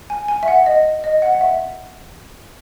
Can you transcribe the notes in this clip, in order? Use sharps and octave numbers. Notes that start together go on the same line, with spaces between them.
G#5
G#5
E5
F#5
D#5
D#5
F#5
F#5
E5